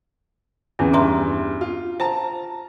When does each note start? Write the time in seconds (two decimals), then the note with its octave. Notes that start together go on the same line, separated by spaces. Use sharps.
0.79 E2 E3 C#4
0.93 E2 G2 E5 A#5 C6
1.61 F4
2.00 C5 A5 A#5